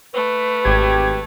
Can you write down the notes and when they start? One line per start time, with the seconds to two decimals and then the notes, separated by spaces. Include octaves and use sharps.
0.14 A3 B4
0.65 G#1 G4 G#6